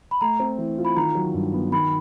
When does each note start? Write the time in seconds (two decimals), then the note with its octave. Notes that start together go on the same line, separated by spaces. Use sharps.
0.11 B5
0.21 A3 A#5
0.40 C4
0.58 E3
0.78 F4
0.85 B5
0.96 D#3 A#5
1.15 F#3
1.34 G2
1.54 B3
1.72 D#3 B5